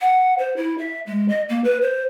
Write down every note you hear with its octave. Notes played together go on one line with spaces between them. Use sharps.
F#5
C5
E4
E5
G#3
D#5
A#3
B4
C5